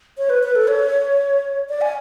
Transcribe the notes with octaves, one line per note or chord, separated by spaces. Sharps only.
C#5
B4
B4
A4
C#5
D5
G#5